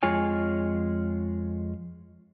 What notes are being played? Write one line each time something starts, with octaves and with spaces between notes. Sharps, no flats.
F2 G#3 F4 C#5 G#5